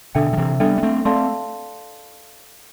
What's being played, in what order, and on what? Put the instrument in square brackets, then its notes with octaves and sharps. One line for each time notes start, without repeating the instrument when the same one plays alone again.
[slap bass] B2 D3 [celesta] D4 A4 E5 G5
[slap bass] F3
C3 E3
[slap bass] G3 B3 [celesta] D4 A4 E5 G5
[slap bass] B3
A3 C4
[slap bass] A3 C4 [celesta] A4 D5 F5 A5 C6